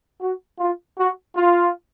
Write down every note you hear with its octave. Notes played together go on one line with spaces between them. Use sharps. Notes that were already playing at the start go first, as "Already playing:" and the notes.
F#4
F4
F#4
F4